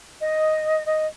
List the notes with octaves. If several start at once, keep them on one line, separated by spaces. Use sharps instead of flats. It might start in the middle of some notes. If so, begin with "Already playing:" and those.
D#5
D#5